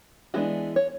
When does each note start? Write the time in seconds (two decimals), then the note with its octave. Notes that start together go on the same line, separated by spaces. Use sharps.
0.34 E3 G#3 B3 D4 F#4
0.76 C#5